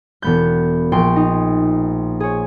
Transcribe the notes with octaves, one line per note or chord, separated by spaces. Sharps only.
E1 B3 G6
A#1 G5 C6
D#4
G#4 C#5